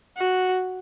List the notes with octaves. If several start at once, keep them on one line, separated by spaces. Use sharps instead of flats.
F#4